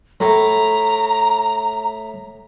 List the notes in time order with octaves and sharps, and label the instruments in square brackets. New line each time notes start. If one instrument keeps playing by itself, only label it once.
[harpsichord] A2 [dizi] A#5